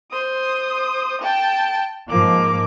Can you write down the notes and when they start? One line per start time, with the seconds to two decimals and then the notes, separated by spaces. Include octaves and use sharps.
0.11 C5 D#6
1.22 G5 A5
2.08 G#2 F3 A#3 D6